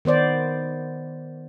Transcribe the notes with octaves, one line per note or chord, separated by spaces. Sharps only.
D#3 B3 C5 D5